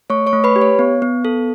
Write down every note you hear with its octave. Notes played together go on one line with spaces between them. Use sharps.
A3 C#5 C#6
C#5 C#6
A3
B4 B5
G4
C#5
B3
B3
A4